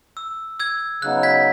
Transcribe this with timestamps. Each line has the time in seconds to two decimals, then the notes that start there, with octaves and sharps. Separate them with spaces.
0.17 E6
0.60 E6 G#6
1.02 C#3 F#3 B3 D#4 F#6
1.23 G#6 B6